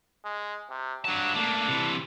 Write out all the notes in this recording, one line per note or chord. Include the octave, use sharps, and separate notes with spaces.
G#3
C3
G2 F#3 A5
A3 A#3 D4
C3 E3